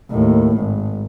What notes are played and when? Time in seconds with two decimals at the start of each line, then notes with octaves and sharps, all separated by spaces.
0.11 D#2 A2
0.57 G#1